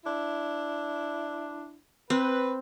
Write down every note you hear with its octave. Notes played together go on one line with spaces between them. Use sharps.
D4 E4
C4 B4